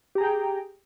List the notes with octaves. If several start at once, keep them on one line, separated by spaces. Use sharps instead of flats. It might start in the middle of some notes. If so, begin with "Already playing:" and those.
G4 G#4 G5 A#5